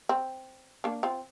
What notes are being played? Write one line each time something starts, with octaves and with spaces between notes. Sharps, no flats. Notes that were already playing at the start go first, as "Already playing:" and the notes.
C4
A#3 D4
C4 F4